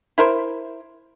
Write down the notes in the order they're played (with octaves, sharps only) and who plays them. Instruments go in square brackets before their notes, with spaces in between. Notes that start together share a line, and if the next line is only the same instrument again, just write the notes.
[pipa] E4 A#4 C5